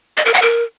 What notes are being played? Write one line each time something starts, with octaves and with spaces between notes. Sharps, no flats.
D#5
A#4
F#5
A#4